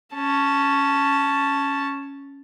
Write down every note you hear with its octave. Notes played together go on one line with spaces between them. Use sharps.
C#4 A5